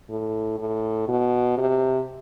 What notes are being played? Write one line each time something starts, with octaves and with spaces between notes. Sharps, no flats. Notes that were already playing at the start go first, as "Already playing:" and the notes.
A2
A2
B2
C3